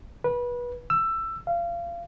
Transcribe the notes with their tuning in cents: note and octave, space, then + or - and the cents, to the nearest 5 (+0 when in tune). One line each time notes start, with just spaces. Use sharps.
B4 -25
E6 +15
F5 -25